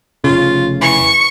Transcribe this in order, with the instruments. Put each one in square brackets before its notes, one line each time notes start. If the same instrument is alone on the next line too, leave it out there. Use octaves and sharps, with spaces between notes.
[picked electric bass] F1 C#3 [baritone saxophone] F4
[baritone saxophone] E3 [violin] C#6